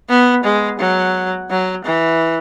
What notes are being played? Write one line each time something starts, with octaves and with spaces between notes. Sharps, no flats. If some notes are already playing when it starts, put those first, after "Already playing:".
B3
G#3
F#3
F#3
E3